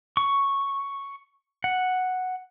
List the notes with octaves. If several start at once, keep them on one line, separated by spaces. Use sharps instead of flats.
C#6
F#5